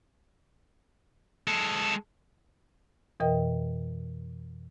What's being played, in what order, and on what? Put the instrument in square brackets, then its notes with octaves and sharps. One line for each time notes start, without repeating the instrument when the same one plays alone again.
[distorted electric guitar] G#3 A4
[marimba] F2 B2 E3 A#4 D#5 G5